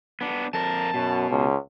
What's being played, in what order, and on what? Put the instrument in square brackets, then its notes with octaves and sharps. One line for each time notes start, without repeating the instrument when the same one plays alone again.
[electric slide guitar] B3 D4
[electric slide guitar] F2 A#4 [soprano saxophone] A5
[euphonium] F#2 [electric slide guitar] B2
[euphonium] C#2